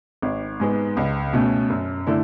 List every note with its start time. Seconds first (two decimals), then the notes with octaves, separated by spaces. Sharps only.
0.22 G#1
0.60 G#2 G#3 B3
0.97 C#2
1.33 B2 A3 C#4
1.70 F#2
2.07 D3 A3 E4